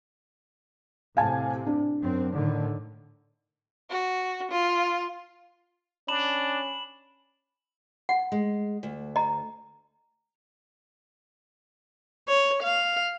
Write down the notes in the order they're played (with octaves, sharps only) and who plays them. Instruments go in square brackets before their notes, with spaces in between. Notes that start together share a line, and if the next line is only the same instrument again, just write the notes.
[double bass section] A2 C3 [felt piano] F5 G#5 A5
[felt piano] D4
[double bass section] F#2 C4
A2 D3 D#3
[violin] F#4
F4
[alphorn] C#4 [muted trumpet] D4 [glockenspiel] B5 E7 [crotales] F#7
[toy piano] F#5
[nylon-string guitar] G#3
D2
[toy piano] D#5 A#5
[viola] C#5
F5